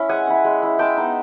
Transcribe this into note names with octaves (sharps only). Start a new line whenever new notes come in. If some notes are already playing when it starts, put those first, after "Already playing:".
Already playing: C#4 E4
G#3 F#5 G#5
C#4 E4
G#3
C#4 E4
G#3 G5 A5
B3 D#4